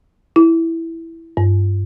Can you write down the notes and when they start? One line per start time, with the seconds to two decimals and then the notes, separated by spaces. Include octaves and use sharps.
0.36 E4
1.37 G2